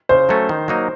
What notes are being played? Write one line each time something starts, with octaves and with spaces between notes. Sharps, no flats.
C#3 C5
F#3 A3 C#4 A4
D#3
F#3 A#3 D#4